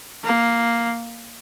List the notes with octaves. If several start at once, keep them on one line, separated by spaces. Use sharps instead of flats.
A#3